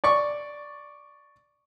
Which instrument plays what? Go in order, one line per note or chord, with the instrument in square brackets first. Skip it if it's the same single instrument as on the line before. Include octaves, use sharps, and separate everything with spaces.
[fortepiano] D5 C#6